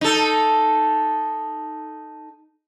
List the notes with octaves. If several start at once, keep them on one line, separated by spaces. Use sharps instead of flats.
D#4 A4